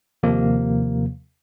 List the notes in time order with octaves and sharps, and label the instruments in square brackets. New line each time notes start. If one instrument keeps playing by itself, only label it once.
[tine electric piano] D#2 C3 F3 A#3